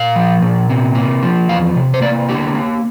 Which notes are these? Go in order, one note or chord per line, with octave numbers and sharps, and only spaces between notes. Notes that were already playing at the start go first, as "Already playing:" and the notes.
Already playing: A#2 F5
F3
A#2
C3
A#3
F3
E2 F5
C3
C5
A#3 D5
D3 G4
A#3